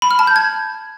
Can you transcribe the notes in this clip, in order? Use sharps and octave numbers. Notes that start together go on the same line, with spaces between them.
B5
F6
A5
G6
G#6